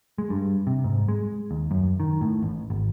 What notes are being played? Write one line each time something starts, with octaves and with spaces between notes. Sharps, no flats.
G#3
G2
C3
G#2
G#3
D#2
F#2
D#3
A2
A1
G#1